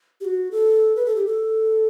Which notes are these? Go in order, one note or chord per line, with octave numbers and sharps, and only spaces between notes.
G4
F#4
A4
B4
A4
G4
A4